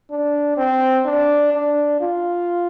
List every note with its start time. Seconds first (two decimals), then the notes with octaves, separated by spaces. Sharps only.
0.11 D4
0.57 C4
1.06 D4
1.53 D4
2.01 F4